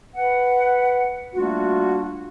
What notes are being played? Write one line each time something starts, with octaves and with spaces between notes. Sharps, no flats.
B4 F#5
G3 A3 A#3 D4 F4 F#4